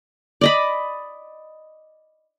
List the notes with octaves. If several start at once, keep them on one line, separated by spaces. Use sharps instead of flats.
D5 D#5 B5